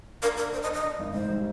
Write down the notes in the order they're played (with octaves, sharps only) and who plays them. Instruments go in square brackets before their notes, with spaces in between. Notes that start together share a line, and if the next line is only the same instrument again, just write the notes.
[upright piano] D4 [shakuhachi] A#4
[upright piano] D4 [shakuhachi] A#4
[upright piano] D4 [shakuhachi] C5
[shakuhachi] D#5
[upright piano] D4
[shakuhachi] D#5
[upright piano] D4
G#1
[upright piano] G#2 [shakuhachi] C5
[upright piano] G3